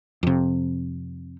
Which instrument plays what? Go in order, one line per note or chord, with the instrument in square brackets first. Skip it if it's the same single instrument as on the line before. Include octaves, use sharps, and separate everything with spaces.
[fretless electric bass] F2 C3